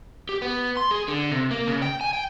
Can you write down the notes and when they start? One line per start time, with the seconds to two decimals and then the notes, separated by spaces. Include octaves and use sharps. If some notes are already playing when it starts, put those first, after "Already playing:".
0.29 G4
0.42 B3
0.77 C6
0.91 G#4
1.08 D3
1.31 C3
1.51 A#3
1.67 C#3
1.82 G5
2.01 G#5
2.13 G5